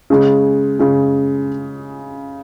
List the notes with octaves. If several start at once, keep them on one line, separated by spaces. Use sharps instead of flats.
C#3 G#3
C#3 G#3